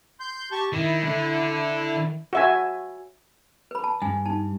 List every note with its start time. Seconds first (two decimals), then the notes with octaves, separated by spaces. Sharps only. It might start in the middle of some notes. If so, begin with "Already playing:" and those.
0.20 C6 G6
0.52 G4 A5 C#6
0.73 D#3 E4
1.03 D3
2.33 F#4 E5 G#5
3.71 B4 B5
3.84 A5
4.02 G2 G#5
4.25 D#4 A5